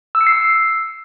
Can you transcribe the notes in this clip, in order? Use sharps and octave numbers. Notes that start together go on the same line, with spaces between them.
E6
C#7
C7
E6